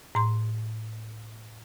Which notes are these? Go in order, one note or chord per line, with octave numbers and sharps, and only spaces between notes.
A2 C6